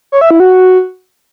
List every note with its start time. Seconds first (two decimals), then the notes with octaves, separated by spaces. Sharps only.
0.12 C#5
0.21 E5
0.31 E4
0.40 F#4